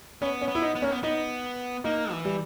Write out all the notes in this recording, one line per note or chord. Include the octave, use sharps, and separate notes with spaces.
B3 C#4
C#4
B3
E4
D#4
B3
A#3 C#4
B3
B3 D#4
A#3 D#4
E3
G3